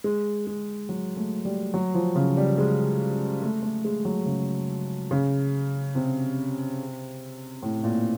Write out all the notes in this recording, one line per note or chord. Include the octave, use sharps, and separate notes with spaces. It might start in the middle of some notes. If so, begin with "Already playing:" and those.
G#3
G#3
F#3
A3
G3
F#3
F3
C#3
G3
G#3
A3
A3
G#3
F#3
C#3
C#3
C3
A2
A#2